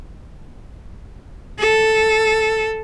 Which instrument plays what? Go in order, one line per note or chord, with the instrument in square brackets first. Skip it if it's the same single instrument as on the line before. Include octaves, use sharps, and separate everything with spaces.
[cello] A4